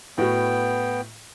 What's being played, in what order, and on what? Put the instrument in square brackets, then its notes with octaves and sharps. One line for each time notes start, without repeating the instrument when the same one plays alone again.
[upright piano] A2 F#4 [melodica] B3 G5